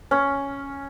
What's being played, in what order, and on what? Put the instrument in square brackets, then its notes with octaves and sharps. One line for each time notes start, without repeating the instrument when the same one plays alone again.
[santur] C#4